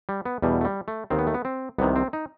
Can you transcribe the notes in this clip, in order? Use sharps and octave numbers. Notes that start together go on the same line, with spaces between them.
G3
B3
E2 B2 G3
A3
G3
A3
D#2 D#3 C4
B3
A3
B3
C4
C2 C3 D#3 B3
C4
D#4